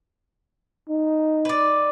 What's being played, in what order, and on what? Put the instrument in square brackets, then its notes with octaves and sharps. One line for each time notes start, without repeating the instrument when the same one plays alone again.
[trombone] D#4
[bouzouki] B4 D5